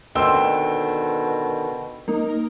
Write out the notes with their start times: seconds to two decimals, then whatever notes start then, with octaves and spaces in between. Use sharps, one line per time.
0.15 B2 D3 D#3 C4 G5 C6 E6
2.08 A#3 D#4